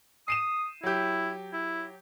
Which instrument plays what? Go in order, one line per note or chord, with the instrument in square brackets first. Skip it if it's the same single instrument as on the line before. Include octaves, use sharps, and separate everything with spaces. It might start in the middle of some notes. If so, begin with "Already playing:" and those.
[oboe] D#6 [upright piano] C7 D#7 E7
[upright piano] F#3 G4 [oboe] E4
[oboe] E4